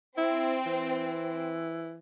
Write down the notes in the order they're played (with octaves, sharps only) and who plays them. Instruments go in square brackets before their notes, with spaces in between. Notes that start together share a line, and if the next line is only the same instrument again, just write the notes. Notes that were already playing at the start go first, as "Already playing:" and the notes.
[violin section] C4 [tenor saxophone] E4
[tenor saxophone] E3